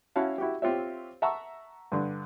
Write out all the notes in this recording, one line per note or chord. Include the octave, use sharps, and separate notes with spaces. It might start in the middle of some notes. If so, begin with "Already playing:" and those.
C#4 E4 F#4 F5 A5
E4 F#4 G4
C4 F4 G4 C#5 E5
E5 F#5 A5 A#5 C#6 E6
G2 D3